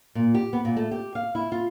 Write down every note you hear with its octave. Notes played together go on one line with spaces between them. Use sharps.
A#2
G4
B3
A#2
A3
G4
F5
E4
F4